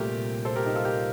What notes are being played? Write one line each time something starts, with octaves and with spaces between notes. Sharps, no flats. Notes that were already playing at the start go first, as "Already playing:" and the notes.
Already playing: C2 A#2 A3 G4 A#4
A4 C5
G4 A#4
D#4 G4
F4 A4
G4 A#4